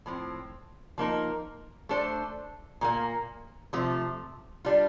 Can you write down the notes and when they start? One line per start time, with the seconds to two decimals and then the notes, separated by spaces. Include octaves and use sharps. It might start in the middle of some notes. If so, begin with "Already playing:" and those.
0.06 A2 F3 C4
0.98 F3 A#3 D#4 A#4
1.89 A3 D4 A4 C5
2.81 A#2 G3 A#3
3.73 C3 F3 A3
4.65 G3 D4 F4